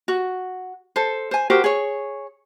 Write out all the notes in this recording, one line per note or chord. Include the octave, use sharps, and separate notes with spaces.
F#4
A4 C5
C5 G#5
F#4 G4 A#4 C5
G#4 C#5